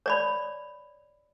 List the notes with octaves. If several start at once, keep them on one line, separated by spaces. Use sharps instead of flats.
C#5 D5 B5